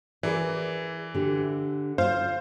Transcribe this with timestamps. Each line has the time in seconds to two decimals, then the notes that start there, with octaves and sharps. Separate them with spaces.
0.23 E3 G#4 A#4 D5
1.15 D3 G4
1.98 F4 C5 F5